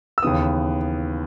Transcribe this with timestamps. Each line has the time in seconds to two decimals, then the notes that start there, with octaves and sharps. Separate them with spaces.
0.18 E6
0.22 D#2 C#3 E3 B3 D#6